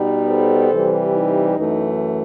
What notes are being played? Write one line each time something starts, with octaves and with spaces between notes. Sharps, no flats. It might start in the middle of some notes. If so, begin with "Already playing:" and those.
Already playing: B2 G3 B3 D#4
A4 C5
C3 E3 G3
D#4
F#2 E3 A3